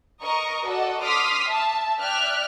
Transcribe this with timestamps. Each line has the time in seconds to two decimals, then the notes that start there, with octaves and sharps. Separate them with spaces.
0.22 A#4 D#5 A#5 C#6
0.65 F#4 A4 D5 D#5
1.02 C6 D6 D#6 F6 B6 C7
1.46 E5 A5
2.00 D5 E5 G5 F6 F#6